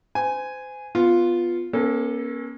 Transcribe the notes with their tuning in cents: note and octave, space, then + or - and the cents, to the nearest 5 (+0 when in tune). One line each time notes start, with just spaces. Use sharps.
C5 -35 G#5 +0
B3 +0 F4 +0
A#3 +35 C#4 -25 A4 +0